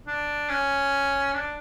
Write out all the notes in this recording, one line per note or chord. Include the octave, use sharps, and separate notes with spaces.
D4
C#4
D4